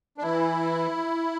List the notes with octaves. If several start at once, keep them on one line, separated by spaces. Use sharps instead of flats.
D4
E3 E4